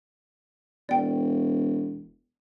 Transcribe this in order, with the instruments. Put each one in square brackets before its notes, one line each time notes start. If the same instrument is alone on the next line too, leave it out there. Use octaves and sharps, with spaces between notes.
[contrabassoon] E1 [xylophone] D5 G5